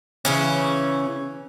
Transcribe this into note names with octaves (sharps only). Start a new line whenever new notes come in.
C#3 E3 C#4